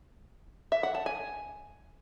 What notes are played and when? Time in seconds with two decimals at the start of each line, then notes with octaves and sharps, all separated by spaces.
0.72 E5
0.83 F#5
0.95 A5
1.06 G#5